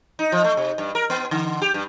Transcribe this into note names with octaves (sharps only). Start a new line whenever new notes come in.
D#4
F3
A3
C3
G2
A#4
B3
D3
G4
G2